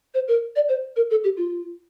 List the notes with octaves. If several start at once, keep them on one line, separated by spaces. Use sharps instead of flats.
C5
A#4
D5
C5
A#4
A4
G4
F4